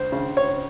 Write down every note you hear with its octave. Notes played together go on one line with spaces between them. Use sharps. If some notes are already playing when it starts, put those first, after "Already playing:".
Already playing: C#2 C5
C#3
C#5